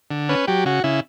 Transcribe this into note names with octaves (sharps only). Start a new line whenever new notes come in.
D3
C#4 B4
F#3 G4
C#3 F#4
C#3 E4